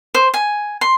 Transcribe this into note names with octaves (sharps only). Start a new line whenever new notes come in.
C5
G#5
C6